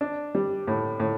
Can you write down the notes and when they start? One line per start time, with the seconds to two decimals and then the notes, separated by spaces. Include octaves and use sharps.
0.01 D4
0.35 G3
0.68 A2
1.00 A2